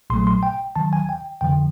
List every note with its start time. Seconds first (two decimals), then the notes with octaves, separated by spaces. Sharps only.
0.10 A#1 A#2 F#3 A3 C6
0.27 C6
0.43 G5
0.76 D#2 D#3 F#3 A5
0.93 G#5
1.09 G5
1.41 F2 D3 F3 G5